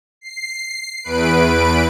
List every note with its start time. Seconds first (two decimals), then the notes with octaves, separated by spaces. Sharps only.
0.21 C7
1.03 E2 B4 D7